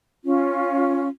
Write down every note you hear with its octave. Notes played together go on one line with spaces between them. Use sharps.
C#4 F4